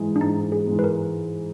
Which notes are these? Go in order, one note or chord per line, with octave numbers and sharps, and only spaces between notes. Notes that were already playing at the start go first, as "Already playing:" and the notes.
Already playing: G#2 E3 G#3
D4
G#2 D#4
G#4
E3 G#3
B4
A#4